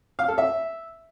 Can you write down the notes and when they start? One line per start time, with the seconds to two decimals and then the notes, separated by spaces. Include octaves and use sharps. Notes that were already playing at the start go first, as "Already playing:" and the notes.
0.19 F5
0.28 A4
0.38 E5